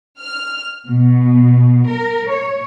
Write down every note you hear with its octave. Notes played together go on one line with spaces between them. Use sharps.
F6
B2
A#4
C#5